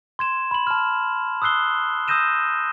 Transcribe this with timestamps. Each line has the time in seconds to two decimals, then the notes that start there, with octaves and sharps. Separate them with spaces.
0.19 C6 G#6 E7
0.51 B5 F#7
0.67 A5 F6
1.42 D#6 E6 F#6 C7 G7
2.08 D#6 E6 G6 A#6 D#7 E7